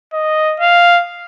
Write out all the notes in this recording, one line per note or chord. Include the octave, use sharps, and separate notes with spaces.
D#5
F5